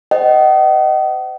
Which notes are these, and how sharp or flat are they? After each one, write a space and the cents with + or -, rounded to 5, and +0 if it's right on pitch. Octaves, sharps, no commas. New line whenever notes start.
C5 -25 D#5 +0 F#5 +45